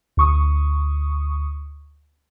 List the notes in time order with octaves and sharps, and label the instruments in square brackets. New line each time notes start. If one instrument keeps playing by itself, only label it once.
[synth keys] D2 C#6 D#6